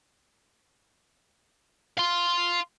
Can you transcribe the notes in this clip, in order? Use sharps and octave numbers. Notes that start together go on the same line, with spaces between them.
F5 C6